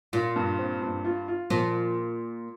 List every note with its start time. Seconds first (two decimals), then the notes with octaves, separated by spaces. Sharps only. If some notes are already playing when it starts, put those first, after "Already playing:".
0.13 A#2 F4
0.36 G2
0.59 C4
0.81 G2
1.05 F4
1.28 F4
1.50 A#2 F3